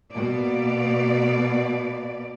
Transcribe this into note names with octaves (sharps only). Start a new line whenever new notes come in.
B2 A#3 D5